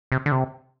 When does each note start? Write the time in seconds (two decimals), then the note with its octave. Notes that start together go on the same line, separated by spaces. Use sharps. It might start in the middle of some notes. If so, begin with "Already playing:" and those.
0.12 C3
0.26 D3
0.32 C3